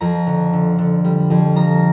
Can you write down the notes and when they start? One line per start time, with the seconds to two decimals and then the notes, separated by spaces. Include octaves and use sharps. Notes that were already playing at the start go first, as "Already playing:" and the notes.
0.01 F2 A#5
0.27 D3
0.53 D3
0.78 D3
1.04 G3
1.30 F2
1.56 F3 A#5